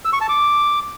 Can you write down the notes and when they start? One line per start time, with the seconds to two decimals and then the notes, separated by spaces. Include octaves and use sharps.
0.05 E6
0.13 C#6
0.21 A5
0.29 D6